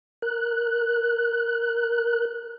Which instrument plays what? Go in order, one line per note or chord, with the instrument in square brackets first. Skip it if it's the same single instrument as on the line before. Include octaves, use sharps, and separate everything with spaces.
[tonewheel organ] A#4 F#6